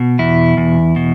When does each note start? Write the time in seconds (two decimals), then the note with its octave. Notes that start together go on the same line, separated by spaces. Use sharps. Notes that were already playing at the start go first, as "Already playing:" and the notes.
Already playing: B2
0.19 E2 E4
0.57 E2
0.96 B2